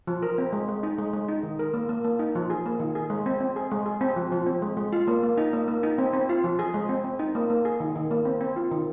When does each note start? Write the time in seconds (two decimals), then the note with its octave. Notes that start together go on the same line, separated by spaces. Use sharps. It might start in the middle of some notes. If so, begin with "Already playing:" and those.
0.07 F3
0.23 A#4
0.38 C4
0.53 G#3
0.68 G#3
0.83 D#4
0.98 G#3
1.13 G#3
1.28 D#4
1.43 D#3
1.59 A#4
1.74 A#3
1.89 A#3
2.04 A#3
2.19 D#4
2.35 F3
2.50 G#4
2.66 A#3
2.80 D#3
2.95 G#4
3.10 G#3
3.26 C4
3.41 C4
3.56 G#4
3.71 G#3
3.86 G#4
4.01 C4
4.16 F3
4.32 F3
4.47 C4
4.62 G#3
4.77 G#3
4.93 F4
5.08 A#3
5.23 A#3
5.38 D#4
5.53 A#3
5.68 A#3
5.83 D#4
5.98 C4
6.13 C4
6.29 F4
6.44 F3
6.59 G#4
6.74 G#3
6.89 C4
7.04 C4
7.19 D#4
7.35 A#3
7.50 A#3
7.65 G#4
7.80 D#3
7.95 D#3
8.11 A#3
8.25 C4
8.41 C4
8.56 F4
8.71 D#3